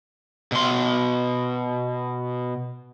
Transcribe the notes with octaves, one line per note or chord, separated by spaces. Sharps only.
B2 C6